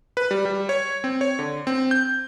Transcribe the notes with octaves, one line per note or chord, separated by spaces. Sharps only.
B4
G3
G3
C#5
C4
C#5
D3
C4
G6